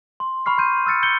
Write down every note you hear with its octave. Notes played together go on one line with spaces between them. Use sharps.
C6
B5 C#6 F6 C7
B5 C6 G6 D#7
E6 F6 A6 C#7
F6 G6 C#7 G7